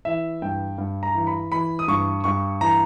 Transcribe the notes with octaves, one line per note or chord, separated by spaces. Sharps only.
E3 E5
G2 G5
G2
A#5
E3
B5
E3 B5
D#6
G2 C#6
G2 C#6
E3 A#5